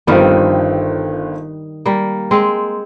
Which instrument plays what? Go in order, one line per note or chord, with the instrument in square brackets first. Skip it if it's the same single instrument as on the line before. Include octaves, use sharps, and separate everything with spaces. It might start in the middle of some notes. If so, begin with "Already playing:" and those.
[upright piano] G1 G2 F3 C4 [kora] D#3 G3
[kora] G3 A#3
G#3 C4